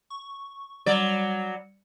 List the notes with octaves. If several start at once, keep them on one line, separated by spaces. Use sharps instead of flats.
C#6
F#3 G3 D5